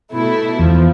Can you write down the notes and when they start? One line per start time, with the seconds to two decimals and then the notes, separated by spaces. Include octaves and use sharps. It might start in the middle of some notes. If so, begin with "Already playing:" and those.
0.12 B2 A3 E4
0.59 E2 F3